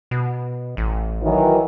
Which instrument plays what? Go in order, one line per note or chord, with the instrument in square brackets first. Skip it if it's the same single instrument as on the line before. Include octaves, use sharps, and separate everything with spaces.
[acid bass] B2
A1
[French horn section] D#3 E3 F#3